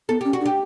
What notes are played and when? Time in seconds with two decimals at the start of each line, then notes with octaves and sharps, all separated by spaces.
0.09 B3 A4
0.21 C#4 G4
0.33 F#4
0.41 D4
0.46 G4